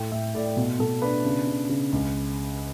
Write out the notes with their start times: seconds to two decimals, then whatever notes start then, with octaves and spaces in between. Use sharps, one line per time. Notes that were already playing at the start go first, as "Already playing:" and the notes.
Already playing: A2 G5
0.12 A2 E5
0.35 A2 D5
0.57 B2
0.79 B2 A4
1.02 D4 B4
1.25 C#3
1.47 C#3
1.69 C#3
1.93 C#2